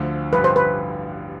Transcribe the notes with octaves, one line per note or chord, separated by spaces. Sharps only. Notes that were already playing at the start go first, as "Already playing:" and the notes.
Already playing: D2 D3 F3
A1 G2 D3 F3 B4
C5
B4